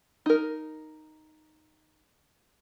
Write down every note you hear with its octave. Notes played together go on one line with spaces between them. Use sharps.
D#4 A#4